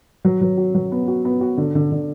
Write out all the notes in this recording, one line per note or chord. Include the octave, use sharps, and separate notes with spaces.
F#3
F#3
F#4
F#3
B3
F#4
B3
F#4
D3
D3
D3